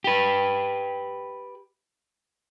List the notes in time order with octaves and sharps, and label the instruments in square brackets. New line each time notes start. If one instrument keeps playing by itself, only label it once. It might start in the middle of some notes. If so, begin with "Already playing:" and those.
[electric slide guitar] G4 B4